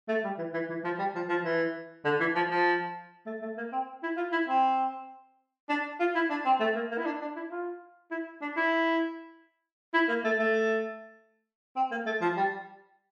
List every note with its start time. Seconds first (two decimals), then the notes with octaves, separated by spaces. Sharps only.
0.08 A3
0.24 G3
0.38 E3
0.53 E3
0.69 E3
0.84 F3
0.99 G3
1.15 F3
1.29 F3
1.45 E3
2.05 D3
2.20 E3
2.36 F3
2.51 F3
3.26 A3
3.42 A3
3.57 A#3
3.72 C4
4.03 E4
4.17 F4
4.32 E4
4.48 C4
5.69 D4
6.00 F4
6.15 E4
6.30 D4
6.45 C4
6.60 A3
6.75 A#3
6.91 A#3
6.98 E4
7.06 D4
7.21 D4
7.35 E4
7.51 F4
8.11 E4
8.41 D4
8.57 E4
9.94 E4
10.08 A#3
10.24 A3
10.39 A3
11.76 C4
11.91 A#3
12.06 A3
12.21 F3
12.36 G3